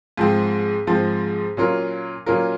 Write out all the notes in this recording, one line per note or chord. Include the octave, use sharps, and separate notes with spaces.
G#2 F3 C4
G#2 F3 C4
A#2 F#3 C#4 F4 A#4
A#2 F#3 C#4 F4 A#4